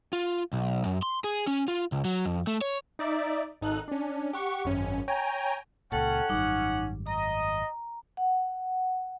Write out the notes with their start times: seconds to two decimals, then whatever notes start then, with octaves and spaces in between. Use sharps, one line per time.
0.13 F4
0.53 B1
0.85 F#2
1.03 C6
1.24 G#4
1.47 C#4
1.68 F4
1.92 C#2
2.05 F#3
2.26 F2
2.47 A3
2.61 C#5
2.99 D#4 D5 E5
3.61 G#1 D#4 A4 F#6
3.88 C#4 D4
4.33 G4 F#5 C#6
4.65 G#1 F#2 C#4
5.08 C#5 G5 G#5 A#5
5.92 C#2 A#2 C#4 A4 F#5 G5 A5
6.29 G#1 F#2 G3 D#4 D6
7.07 D#5 A#5
8.17 F#5